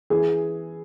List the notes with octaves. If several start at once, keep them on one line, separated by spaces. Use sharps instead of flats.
E3 G#4